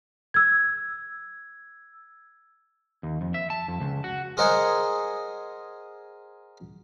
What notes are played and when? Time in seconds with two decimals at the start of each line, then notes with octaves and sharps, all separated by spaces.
0.34 E6 G#6
3.03 D#2
3.21 F2
3.34 E5
3.50 A5
3.68 F2
3.80 C#2
4.04 F#4
4.37 G#4 A#4 C5 D#5 F#5 G#5